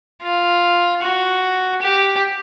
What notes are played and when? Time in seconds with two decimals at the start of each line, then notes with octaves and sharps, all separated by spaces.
0.22 F4
1.02 F#4
1.82 G4